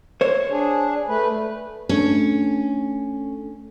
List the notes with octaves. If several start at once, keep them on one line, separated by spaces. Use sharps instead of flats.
C5 C#5
D4 G#4
A3 B4
A3 C#4 D4 A4